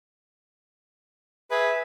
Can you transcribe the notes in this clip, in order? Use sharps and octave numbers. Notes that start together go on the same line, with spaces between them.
G#4 B4 E5